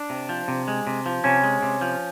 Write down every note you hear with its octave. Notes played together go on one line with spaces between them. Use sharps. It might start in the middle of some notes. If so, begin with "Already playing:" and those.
Already playing: D4
C3
F3
C3
G#3
C3
F3
C3 C#4
G#3
C3
F3